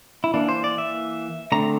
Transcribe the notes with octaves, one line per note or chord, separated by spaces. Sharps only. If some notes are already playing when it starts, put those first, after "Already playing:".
E4
E3 A#3 D4
C5
D5
E5
D3 A3 C4 A#5